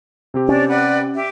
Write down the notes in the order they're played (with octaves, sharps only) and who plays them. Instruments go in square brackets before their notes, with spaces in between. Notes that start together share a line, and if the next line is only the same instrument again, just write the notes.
[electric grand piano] C3 C4 G4
[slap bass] C#4 [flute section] D4 C#5 D5
[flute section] B4 D5 F#5
G4 E5